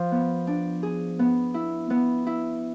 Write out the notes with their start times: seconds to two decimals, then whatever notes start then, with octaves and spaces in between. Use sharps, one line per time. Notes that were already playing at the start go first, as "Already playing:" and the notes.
Already playing: F3
0.12 B3
0.47 D4
0.83 G#4
1.19 B3
1.54 E4
1.90 B3
2.27 E4